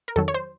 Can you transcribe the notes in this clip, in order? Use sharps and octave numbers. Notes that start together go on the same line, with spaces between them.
A#4
F2 D#3 F#3 A4
C#5
C5